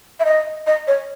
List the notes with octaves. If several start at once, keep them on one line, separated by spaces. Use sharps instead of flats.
E5
D#5
D#5
C#5